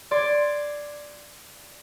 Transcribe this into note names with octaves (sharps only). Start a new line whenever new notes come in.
D5 C6 G#6